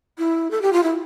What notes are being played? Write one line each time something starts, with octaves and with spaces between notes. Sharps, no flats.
E4
A4
G4
F4
E4